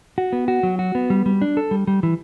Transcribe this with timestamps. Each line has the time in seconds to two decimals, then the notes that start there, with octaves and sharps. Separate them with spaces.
0.18 F#4
0.33 B3
0.48 F#4
0.63 F#3
0.79 F#4
0.95 B3
1.10 G3
1.26 G3
1.42 D4
1.57 A4
1.71 G3
1.87 G3
2.03 E3